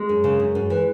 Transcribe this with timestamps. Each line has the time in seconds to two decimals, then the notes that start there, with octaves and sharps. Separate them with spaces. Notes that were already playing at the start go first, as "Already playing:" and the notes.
Already playing: G#3
0.09 F#2
0.24 C#3
0.40 F#2
0.55 F#2
0.70 E3